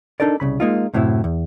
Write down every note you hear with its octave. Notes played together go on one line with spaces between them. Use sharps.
D4 D#4 A4 A#4 D5
C2 C#3 B5
G#3 A#3 D#4 F4
F#2 A2 C3 F#3 E4
E2